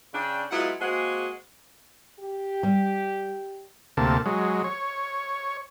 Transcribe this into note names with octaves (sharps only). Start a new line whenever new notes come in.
C#3 D4 G5
F#3 G#3 B3 E4 F4 F#5
G#3 A#3 C4 F#4 G#4
G4
G3
D2 C3 A#3 A5
F#3 G#3
C#5